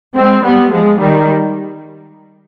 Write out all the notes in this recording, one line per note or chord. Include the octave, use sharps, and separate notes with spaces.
G#3 C4
G3 B3
F3 G#3
D#3 G3